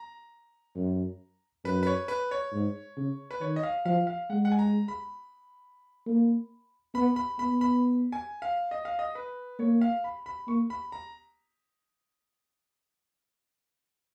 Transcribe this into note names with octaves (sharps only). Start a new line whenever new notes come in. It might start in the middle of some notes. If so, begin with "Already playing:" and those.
Already playing: A#5
F#2
F#2 B4
B4
C#5
B4
C#5
G#2
C#3
B4
D#3 C#5
D#5
F5
F3 F5
F5
G#3 F#5
F#5
G#5
A#5
B5
A#3
B3 B5
B5
B3 B5
B5
G#5
F5
D#5
F5
D#5
B4
A#3 C#5
F5
B5
B5
A#3 C#6
B5
A#5